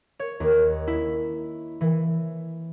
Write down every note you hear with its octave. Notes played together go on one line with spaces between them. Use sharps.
C#5
D#2
E4
E3